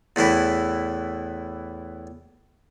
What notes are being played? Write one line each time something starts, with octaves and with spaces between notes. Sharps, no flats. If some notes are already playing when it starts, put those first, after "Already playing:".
E2 A2 E3 E4